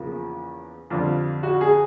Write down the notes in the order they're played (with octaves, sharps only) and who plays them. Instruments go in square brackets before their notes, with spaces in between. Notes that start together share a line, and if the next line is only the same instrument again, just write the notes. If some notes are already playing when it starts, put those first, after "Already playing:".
Already playing: [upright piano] E2 C#3 F3 A#3
F2 D3 G3 F4
F#4
G#4